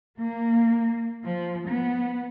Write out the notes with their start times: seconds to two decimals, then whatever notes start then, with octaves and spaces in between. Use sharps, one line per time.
0.17 A#3
1.26 F3
1.68 B3